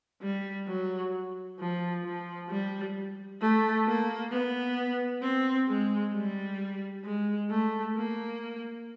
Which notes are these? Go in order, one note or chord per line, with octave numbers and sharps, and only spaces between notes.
G3
F#3
F3
F3
G3
A3
A#3
B3
C4
G#3
G3
G#3
A3
A#3